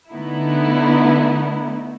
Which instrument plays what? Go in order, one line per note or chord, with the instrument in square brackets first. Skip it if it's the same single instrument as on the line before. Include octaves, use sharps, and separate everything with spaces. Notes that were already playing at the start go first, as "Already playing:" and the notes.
[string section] D3 A3 B3 D#4 E4